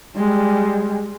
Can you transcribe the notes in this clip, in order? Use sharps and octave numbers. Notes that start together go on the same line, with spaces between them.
G3 G#3